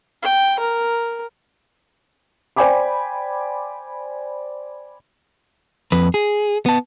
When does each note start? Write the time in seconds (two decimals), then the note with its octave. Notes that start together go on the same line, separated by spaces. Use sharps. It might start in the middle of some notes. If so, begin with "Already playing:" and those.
0.23 G5
0.59 A#4
2.56 C5 D5 G5 G#5 B5 D6
5.92 F2 B4
6.14 G#4
6.66 B3 A5